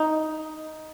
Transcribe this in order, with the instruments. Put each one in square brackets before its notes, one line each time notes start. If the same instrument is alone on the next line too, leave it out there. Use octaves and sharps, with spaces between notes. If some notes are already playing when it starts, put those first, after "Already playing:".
Already playing: [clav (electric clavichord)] D#4